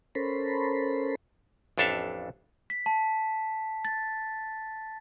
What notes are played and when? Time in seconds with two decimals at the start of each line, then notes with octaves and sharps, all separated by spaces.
0.15 C#4 A4 A#4 C5 B5
1.78 A1 F2 D4 A4 E5 F5
2.70 B6
2.86 A5
3.85 A6